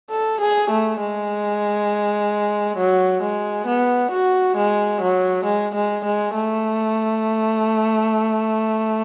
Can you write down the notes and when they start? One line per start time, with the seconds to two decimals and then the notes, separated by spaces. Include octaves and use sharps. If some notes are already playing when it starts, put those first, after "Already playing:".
0.10 A4
0.41 G#4
0.71 A3
1.00 G#3
2.78 F#3
3.22 G#3
3.67 B3
4.12 F#4
4.57 G#3
5.02 F#3
5.45 G#3
5.75 G#3
6.05 G#3
6.35 A3